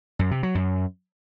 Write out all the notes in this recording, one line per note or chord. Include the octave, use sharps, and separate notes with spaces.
F#2
C3
F#3
F#2